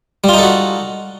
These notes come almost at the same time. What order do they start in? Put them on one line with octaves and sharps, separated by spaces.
G3 F4 D#4 A4 F#4